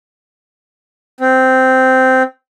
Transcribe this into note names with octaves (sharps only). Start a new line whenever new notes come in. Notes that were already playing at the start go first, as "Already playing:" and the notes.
C4